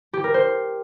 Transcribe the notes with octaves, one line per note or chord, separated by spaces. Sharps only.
G4
A#4
C5